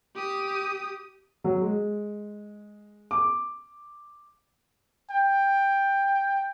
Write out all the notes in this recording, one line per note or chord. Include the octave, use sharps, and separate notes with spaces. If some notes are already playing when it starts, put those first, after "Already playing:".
G4 D#6
F#3
G#3
D6
G5